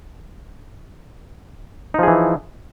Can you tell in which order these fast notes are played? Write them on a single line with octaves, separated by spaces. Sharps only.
D#4 F3 G#4 E3